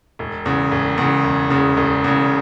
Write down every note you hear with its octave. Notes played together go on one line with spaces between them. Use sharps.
E1
E2 C#3
E1
E2 C#3
E1
E2 C#3
E1
E2 C#3